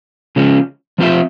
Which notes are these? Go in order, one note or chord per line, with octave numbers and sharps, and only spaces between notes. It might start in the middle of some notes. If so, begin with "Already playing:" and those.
C#3 F3 G#3 C#4
F3 C4 F4 C5 E5